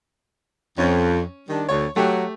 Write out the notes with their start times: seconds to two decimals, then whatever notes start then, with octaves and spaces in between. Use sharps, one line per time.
0.78 F2 C#4
1.49 D#3 G3 D4
1.69 D2 C#5
1.96 F#3 A3 G4